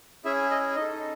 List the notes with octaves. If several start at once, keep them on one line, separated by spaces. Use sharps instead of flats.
C#4 E4 G#4 E5
D#5
D#4 A4 D#5